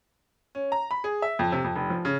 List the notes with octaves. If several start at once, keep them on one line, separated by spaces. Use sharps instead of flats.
C#4
A#5
B5
G#4
E5
F2
C3
F2
F1
F3
C#3